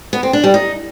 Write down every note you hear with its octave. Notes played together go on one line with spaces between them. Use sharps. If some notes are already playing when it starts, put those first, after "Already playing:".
B3
C4
D4
G3
D#4